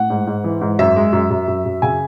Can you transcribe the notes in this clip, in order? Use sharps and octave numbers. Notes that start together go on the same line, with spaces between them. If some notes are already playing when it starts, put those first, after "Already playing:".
Already playing: A2 F#5
G#2
G#2
E3
G#2
F#2 E5
G#3
F#2
F#2
F#2
F#2
C#3 G#5